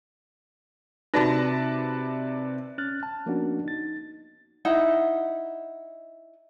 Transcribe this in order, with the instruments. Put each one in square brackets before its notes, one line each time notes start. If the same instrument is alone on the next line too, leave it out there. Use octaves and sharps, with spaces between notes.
[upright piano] C3 A#6 [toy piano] D#4 F#4 B5 [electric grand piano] B4 D5 A5
[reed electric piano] C#4 F6 F#6 A6
A5
F3 A#3 B3 C#4 D4 F#4
D#4 A6
[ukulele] D#4 E4 F#5